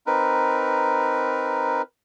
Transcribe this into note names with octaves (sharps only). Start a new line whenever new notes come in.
C4 D#4 A#4 B4